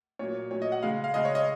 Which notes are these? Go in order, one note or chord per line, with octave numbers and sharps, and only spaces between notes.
A#2 F#3 C#5
A#2 F#3 C#5
D#5
F#5
C#3 G#3 F5
F5
C#3 G#3 D#5
C#5
D#5